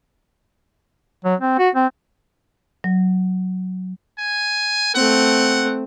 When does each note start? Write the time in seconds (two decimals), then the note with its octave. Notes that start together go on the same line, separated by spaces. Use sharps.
1.25 F#3
1.40 C4
1.59 F#4
1.75 C4
2.84 F#3
4.19 G#5
4.95 A3 C4 F#5